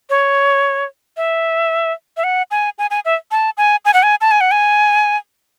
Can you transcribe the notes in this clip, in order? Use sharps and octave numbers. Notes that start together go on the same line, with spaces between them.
C#5
E5
E5
F#5
G#5
G#5
G#5
E5
A5
G#5
G#5
F#5
G#5
A5
G#5
F#5
G#5